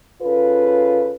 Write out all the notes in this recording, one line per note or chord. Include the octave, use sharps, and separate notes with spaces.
C#3 F4 A4 B4